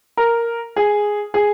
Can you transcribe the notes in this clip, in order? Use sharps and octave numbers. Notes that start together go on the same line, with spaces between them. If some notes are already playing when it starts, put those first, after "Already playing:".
A#4
G#4
G#4